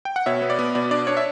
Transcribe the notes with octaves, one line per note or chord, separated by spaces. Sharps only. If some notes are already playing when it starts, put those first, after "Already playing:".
G5
F#5
B2 C#5 E5
B3
D5
B3
B2 D5
D4 D5
D4 C#5
E5